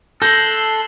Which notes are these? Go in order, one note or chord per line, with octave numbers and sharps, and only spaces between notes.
A4 C6 F#6 G6 A#6